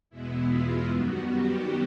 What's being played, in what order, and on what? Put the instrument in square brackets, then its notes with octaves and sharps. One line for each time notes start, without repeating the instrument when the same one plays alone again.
[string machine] E2 B2 G#3 B3 E4
F4
F#2 D#3 G3 B3 F#4
G4